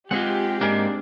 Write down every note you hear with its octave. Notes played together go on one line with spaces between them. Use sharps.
G#3 C4 F4 G4 G#4 D#5 F#5
G#2 A#3 D4